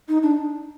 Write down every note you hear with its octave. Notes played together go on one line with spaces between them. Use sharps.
D#4
D4